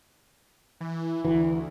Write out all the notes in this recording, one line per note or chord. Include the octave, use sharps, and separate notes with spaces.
E3
D2 E3